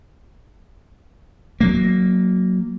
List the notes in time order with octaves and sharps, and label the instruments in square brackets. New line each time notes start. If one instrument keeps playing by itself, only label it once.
[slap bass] F#3 A#3